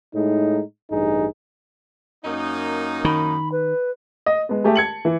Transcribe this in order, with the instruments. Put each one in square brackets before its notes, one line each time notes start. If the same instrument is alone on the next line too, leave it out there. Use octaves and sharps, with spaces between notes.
[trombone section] A2 G#3 D#4
A1 G2 D#4 G#4
[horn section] F#2 A#3 D#4
[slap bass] D#3 [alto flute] B5
[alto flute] B4
[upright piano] D#5
G#3 B3
A3 G4 G#4
A5 G#6 C#7 F#7
E3